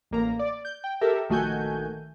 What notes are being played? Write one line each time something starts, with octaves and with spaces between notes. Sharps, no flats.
A1 A#3 A#5
D5
G6
G5
G4 A4 A#4 E5
A#1 D#3 A3 F#4 G#5 G6